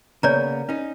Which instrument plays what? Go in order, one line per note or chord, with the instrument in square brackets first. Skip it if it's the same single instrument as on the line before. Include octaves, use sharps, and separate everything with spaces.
[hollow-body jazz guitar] C#3 A#3 B3 [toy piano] C#5 D5 A#5
[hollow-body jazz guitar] C#4 D#4